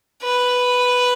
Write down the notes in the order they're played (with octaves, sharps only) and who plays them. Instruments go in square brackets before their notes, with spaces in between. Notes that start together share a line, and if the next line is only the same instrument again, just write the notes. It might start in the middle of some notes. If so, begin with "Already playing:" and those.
[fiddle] B4